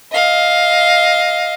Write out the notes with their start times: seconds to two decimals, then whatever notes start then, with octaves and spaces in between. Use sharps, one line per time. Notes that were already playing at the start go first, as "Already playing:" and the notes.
0.12 D#5 F5